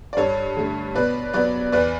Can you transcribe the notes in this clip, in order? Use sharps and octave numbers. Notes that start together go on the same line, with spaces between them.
D5
G2 A4 C#5
D3 A3
B2 B4 D5
F#3 B3 B4 D5
E2 B4 D5